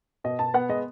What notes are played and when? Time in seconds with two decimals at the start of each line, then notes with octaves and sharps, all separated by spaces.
0.24 B2 D#5
0.39 B2 A5
0.54 B3 F#5
0.69 G#3 D#5